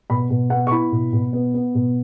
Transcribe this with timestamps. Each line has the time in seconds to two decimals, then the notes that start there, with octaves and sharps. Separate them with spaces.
0.10 B2 B5
0.30 B2
0.50 B3 F#5
0.67 C#6
0.71 E4 B5
0.92 B2
1.13 B2
1.33 B3
1.54 B3
1.75 B2